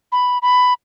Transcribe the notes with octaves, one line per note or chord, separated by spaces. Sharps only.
B5
B5